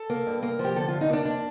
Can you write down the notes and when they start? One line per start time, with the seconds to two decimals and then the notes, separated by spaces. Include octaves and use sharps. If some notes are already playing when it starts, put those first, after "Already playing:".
Already playing: A4
0.10 A#3
0.27 G2
0.43 A#3
0.59 F3
0.65 G4
0.76 D3 A4
0.88 F4
0.93 G2
1.01 D#4
1.09 A#3 D4
1.25 F2 D4